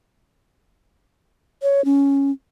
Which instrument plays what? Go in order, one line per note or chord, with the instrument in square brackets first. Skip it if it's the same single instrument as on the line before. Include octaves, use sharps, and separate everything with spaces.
[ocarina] C#5
C#4